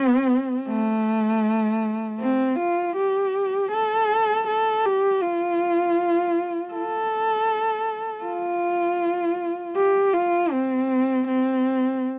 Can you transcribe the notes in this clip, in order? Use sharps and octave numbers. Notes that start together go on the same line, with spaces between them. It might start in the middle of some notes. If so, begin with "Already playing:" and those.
Already playing: C4
A3
C4
F4
G4
A4
A4
G4
F4
A4
F4
G4
F4
C4
C4